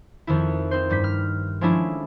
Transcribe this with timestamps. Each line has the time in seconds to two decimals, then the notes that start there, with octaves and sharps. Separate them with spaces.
0.27 F2 D#3 E4
0.71 C4 D#4 C5
0.90 G2 G3 G6 B6
1.04 F6
1.61 F3 G#3 A3 C#4 D4 E4